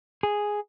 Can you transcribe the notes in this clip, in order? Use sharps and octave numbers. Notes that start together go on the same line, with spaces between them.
G#4